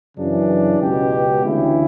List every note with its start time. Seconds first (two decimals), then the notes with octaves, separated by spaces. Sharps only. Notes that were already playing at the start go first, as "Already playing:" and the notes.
0.17 F#2 C#3 E3 D4
0.80 C#2 G4
0.85 B2
1.43 D2 C#3 E3 E4